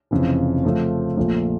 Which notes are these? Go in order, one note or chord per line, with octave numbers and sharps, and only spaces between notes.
F1 F2 C#3 E3
C#3 F3 A3 C4
A#1 A#2 F3 A3